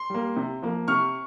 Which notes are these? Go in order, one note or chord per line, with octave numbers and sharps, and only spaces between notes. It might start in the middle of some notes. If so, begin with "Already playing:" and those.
Already playing: C6
G3 A#3
C3
F3 A#3
C3 C#6 F6